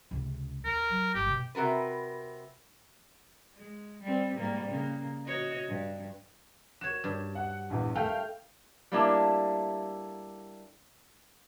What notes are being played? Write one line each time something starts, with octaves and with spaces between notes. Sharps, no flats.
C#2 C3
D#2 A#4
F#3
G1 F#2 G4
B2
C3 F#4 A#4 B4
G#3
G3 C4
G#2 G3 A#3
C#3 A#3
F#4 C#5 D#5
G2
F#4 C#5 E7
G2
F#5
A#1 E2
A3 F5 G5 G6
G3 A3 A#3 D4 E4 G4